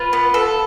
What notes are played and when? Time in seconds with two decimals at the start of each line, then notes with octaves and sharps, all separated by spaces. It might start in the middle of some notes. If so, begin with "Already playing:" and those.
Already playing: F4 B4
0.13 B3
0.34 A4